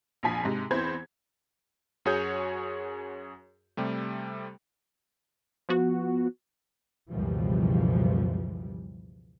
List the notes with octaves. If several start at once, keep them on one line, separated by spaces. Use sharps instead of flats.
A#1 F2 F3 G#5 B6
G#2 C3 G#3
E2 E3 C4 C5 B5 G#6
F#2 F#4 G#4 C#5 D#6 G6
C3 G3 A3
F3 B3 F#4
C#2 F#2 B2 E3 F3 G3